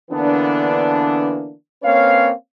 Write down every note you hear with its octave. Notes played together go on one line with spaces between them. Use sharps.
D3 E3 A#3 B3 D4
A#3 C4 C#4 B4 C#5 F5